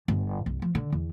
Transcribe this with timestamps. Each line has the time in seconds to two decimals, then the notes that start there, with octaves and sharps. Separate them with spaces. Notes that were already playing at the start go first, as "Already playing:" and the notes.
0.08 G1
0.46 C2
0.62 F3
0.75 D3
0.92 E2